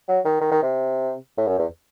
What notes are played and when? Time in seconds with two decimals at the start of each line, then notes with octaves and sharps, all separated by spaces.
0.08 F#3
0.25 D#3
0.41 D#3
0.52 D#3
0.63 C3
1.38 A2
1.47 F#2
1.58 E2